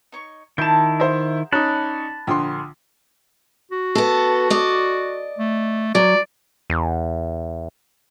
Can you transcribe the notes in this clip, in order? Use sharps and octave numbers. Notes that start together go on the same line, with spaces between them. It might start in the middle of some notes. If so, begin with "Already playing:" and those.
D#4 C#5 C#6
D#3 E4 G#5 A5 G6 E7
G#4 A#4 C5 E5 F#5
C#4 D#4 D5 A5 B5 F#6
A#1 D3 G5 A#5 C6 D#6
F#4
B3 A4
D5 D#5
A3
F#3 D5
E2